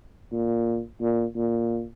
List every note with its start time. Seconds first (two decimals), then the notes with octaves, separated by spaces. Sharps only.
0.32 A#2
1.01 A#2
1.36 A#2